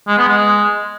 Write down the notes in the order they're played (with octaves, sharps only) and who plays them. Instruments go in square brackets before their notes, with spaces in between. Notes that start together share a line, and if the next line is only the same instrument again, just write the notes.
[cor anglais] G#3
B3
G#3